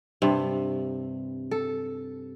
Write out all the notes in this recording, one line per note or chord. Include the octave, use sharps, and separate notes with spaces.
G2 C3
A4